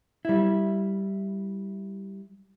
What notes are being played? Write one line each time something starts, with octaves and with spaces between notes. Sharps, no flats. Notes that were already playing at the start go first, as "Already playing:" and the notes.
G3 E4